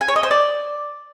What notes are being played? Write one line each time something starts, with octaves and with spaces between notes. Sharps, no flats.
G#5
C#5
D#5
C5
D5